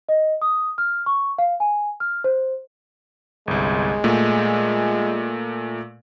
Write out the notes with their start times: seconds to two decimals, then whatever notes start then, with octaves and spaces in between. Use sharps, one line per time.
0.09 D#5
0.42 D#6
0.78 F6
1.06 C#6
1.38 F5
1.60 G#5
2.00 F6
2.24 C5
3.48 G1 C2 G#3
4.04 A#2 A3